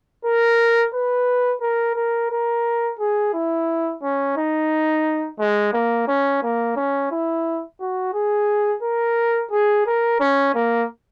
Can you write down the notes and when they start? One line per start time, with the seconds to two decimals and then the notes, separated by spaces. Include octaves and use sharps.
0.25 A#4
0.94 B4
1.62 A#4
1.96 A#4
2.31 A#4
2.99 G#4
3.34 E4
4.03 C#4
4.37 D#4
5.39 G#3
5.74 A#3
6.08 C#4
6.43 A#3
6.77 C#4
7.11 E4
7.80 F#4
8.14 G#4
8.83 A#4
9.51 G#4
9.86 A#4
10.20 C#4
10.55 A#3